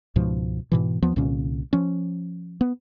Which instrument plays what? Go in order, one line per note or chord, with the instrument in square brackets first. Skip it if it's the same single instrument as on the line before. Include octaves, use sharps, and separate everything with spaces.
[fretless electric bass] C#2 G#2 B2 F3
G#2 B2 E3
D#2 F3 B3
C2 A#2 D3 C#4
F3 C#4
B3